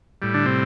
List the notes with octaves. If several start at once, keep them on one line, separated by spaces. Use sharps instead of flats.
A2 G3
D3 D4
C3 C4